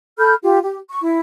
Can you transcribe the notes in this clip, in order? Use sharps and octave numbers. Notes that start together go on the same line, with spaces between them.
A4 B5 F6 G6
F4 G4
G4
C#6
E4